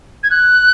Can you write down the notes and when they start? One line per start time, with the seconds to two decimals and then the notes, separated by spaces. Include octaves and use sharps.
0.23 G#6
0.30 F#6